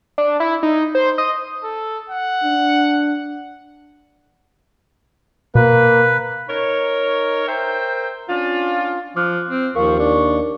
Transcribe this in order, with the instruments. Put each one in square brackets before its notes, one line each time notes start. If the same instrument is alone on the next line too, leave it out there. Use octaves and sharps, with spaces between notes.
[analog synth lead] D4
E4
D#4
C5
D#5
[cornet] A4
F#5
[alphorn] D4
[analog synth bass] B2 [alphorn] A#3 [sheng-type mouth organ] B4
[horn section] D#4 A#4 C#5
A#4 C5 E5 G5
C#4 D4 F4
[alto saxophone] F3 [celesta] D6 F6 F#6
[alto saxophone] C4
[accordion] D#2 C#6 [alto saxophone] F3 [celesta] A#4 F5
[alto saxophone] D4 [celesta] A#4